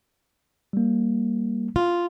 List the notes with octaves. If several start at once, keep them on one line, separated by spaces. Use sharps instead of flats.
G3 A#3
F4